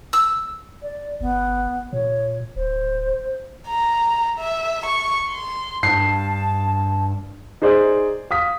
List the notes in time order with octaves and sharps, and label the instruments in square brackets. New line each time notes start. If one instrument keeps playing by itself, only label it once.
[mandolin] E6
[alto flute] D5
[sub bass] G1 [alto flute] B3
[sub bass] A#2 [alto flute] C#5
[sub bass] D1 [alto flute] C5
[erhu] A#5
E5
C#6
C6
[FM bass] G2 [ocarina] A5 [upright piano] C7
[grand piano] D#4 G#4 C5 D5
F5 D#6 B6